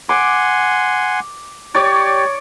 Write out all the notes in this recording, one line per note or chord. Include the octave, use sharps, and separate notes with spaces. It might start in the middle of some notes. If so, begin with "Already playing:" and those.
F#5 G#5 C6 D6
G4 C#5 D5